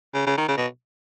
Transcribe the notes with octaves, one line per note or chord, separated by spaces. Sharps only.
C#3
C#3
D#3
C#3
B2